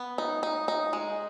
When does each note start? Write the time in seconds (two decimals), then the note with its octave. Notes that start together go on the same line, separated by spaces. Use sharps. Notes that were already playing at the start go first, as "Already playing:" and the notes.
Already playing: B3
0.18 D#4
0.43 D#4
0.68 D#4
0.93 G#3